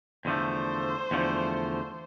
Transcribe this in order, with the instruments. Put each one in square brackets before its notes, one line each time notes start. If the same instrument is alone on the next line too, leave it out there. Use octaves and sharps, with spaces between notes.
[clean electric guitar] E2 D3 F3 A3 [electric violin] C5
[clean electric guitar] E2 D3 F3 A3